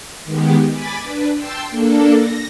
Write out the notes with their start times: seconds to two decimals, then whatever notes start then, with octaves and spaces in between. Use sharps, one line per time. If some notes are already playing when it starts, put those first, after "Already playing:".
0.24 D#3 G#3 B3 G4
0.71 G#5 B5 D6 A6 B6
1.03 D4 B4
1.35 G5 A5 C6 E6
1.70 A#3 D4 A4
2.14 A#6